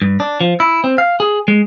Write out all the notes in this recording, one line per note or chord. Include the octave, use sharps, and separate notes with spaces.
G2
D4
F3
E4
C4
F5
G#4
G#3